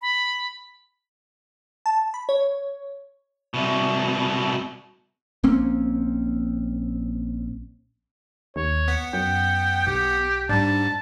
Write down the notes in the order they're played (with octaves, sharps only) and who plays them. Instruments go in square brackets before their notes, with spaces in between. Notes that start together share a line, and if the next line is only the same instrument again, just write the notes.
[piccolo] B5
[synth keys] A5
B5
C#5
[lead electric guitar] C2 B2
[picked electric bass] A#1 A#3 C4 C#4
[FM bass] D#2 [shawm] C#5
[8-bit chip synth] B3 F#5 B6
[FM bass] F#2 [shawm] G5
[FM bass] B1 [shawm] G4
[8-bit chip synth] G#2 G3 [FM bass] D4 [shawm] A5